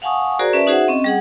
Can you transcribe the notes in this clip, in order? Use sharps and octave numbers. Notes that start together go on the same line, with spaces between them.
F5 F#5 G#5 A5 C#6 D#6
F#4 G#4 A#4 C5 D5 A#5
C#4 B4 D5 E5 A5
D#4 F#4 G#4 C5 E5 F#5
C4 C#4 D#5
G3 G#4 F#5